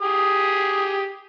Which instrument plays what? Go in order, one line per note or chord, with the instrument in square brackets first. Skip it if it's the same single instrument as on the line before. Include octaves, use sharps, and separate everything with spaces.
[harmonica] G4 G#4 D#6